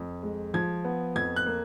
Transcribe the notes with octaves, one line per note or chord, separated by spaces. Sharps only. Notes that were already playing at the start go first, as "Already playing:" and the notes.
Already playing: F2
G#3
F3 G#6
B3
F2 G#6
F#6
A#3